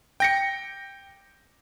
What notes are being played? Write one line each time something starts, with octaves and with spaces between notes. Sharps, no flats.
G5 A#6 C#7